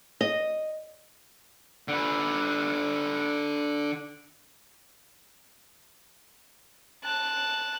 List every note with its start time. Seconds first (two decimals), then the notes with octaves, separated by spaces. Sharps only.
0.21 D#5
1.88 D3 B4
7.04 A5 F#6